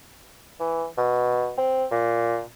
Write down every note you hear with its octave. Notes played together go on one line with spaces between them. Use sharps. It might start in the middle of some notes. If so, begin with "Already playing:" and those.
E3
B2
C4
A#2